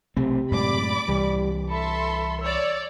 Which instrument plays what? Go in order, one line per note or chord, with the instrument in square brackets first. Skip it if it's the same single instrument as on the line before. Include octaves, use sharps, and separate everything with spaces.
[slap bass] B1 A3 C4 [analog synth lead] C3
[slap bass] F#2 A2 G#3 [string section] D5 B5 D6
[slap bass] C2 E3 [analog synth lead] G3
[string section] A4 E5 C6 [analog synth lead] B5
[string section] C#5 D5 [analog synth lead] E6